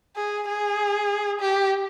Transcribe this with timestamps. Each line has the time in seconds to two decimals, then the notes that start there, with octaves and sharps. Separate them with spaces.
0.16 G#4
0.48 G#4
1.40 G4